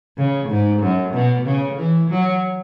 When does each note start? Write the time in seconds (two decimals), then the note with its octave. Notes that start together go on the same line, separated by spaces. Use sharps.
0.18 C#3
0.49 G#2
0.82 F#2
1.14 B2
1.46 C#3
1.78 E3
2.10 F#3